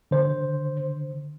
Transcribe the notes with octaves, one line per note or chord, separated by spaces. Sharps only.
D3 C5